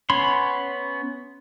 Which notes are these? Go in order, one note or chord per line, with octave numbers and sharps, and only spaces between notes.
B3 C#4 C#5 B5 C6